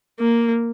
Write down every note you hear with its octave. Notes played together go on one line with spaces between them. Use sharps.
A#3